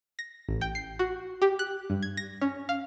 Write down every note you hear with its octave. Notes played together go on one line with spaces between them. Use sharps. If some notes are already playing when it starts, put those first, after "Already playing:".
A#6
A1
G5
C7
F#4
G4
F#6
G2
G#6
A#6
C#4
F5